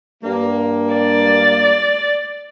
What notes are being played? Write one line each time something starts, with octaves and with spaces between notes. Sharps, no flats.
G2 A#3
D5